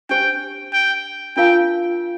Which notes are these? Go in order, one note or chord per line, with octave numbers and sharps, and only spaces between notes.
D4 G4 C5 G5
G5
D4 F4 A#4 F5 G5 A5